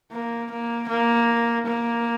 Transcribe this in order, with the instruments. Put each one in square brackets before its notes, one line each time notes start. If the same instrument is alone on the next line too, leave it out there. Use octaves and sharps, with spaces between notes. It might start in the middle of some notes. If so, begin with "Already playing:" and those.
[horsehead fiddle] A#3
A#3
A#3
A#3